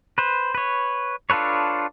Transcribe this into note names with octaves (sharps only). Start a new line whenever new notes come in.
B4 C5
B4 C#5
D4 F4 A4 B4 C#5